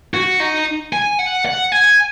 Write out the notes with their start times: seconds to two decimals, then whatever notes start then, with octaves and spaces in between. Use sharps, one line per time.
0.14 F#4
0.40 D#4
0.93 G#5
1.19 F#5
1.46 F#5
1.72 G#5